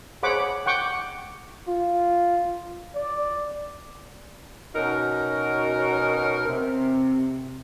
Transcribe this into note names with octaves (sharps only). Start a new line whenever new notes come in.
G#4 C5 C#5 F#5 B5 D6
F#5 G5 C#6 D6
F4
D5
B2 C#4 D#4 F#4 A#4
C3